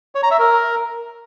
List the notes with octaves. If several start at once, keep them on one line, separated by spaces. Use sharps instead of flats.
C#5
A#5
E5
A#4